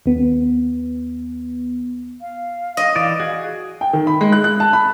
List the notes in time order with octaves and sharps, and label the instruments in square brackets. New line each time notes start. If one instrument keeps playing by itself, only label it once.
[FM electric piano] D#2 B3
[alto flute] F5
[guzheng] D#5
[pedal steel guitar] E3 D5
F#4 G#4
[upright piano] G5
D#3
B5
G#3
F#6
F#6
A5
B5